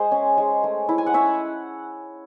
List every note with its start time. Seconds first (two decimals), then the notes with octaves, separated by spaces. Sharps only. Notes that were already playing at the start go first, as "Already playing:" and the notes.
Already playing: G#3 C5 D#5
0.11 C#4
0.38 G#3
0.64 A3
0.89 E4
0.98 G#5
1.06 F#5
1.14 C#4 C#5 E5